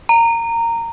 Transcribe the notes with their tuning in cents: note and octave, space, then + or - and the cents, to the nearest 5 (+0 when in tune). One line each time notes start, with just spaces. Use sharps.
A#5 -15